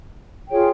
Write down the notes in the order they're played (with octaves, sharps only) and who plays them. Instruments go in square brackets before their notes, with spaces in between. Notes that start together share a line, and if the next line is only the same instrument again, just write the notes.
[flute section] F4 G#4 C#5 G5